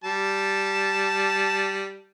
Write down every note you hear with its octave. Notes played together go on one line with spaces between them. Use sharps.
G3 A5